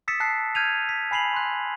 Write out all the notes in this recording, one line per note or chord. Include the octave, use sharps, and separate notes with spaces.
D#6 E6 A6 B6 C#7 E7
A5 F#6 C7
F6 G6 G#6 D#7 F7
B6
G#5 B5 C7 F7 F#7
C6 F#6